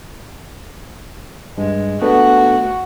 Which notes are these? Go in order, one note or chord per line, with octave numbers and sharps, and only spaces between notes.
G2 G#3
A3 B3 D4 F#4